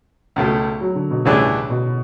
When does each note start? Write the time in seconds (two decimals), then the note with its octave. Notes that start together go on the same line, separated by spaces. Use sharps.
0.36 C#2 B2 A3
0.81 F#3
0.95 D3
1.11 B2
1.25 C#2 A2 C#3 E3 G3 D4
1.70 B2